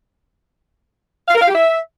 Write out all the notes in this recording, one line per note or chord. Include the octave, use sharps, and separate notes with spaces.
F5
A#4
F5
G4
E5